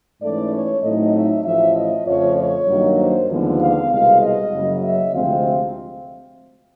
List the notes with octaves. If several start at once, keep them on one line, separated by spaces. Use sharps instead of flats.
G#2 E3 A3 C#4 D5
C#5
A2 F#3 A3 C4 D#4 D#5
E5
A1 A2 F3 E5
D#5
F2 C#3 F3 A3 C#5
C#5
G2 D#3 F#3 A#3 D#4
C5
D#2 D3 F3 G#3 B3
F5
C2 B2 G#3 F5
D#5
F#1 F#2 C#3 F#3
E5
D2 C3 F3 G#3 C4 F5